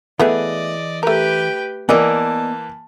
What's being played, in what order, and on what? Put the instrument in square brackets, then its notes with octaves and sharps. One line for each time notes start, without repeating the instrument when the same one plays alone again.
[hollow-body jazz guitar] E3 G#4 [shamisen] A3 B3 [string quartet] D5 D#5
[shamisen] A3 A#4 [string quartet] G4 B4 G5
[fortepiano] E3 A#3 [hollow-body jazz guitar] B3 D5 D#5 [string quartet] A5